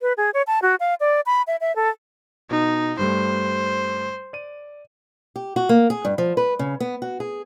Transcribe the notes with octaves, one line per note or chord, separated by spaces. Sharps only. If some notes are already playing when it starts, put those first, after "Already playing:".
B4
G#4
C#5
A5
F#4
F5
D5
B5
E5
E5
A4
B2 D#4
G2 G3 A3 C5
D5 D#7
G4
F#4
A#3
G#4
G2
F3
B4
C#3
B3
F#4
G#4